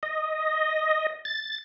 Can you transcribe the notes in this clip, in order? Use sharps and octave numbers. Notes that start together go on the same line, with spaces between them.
D#5
A6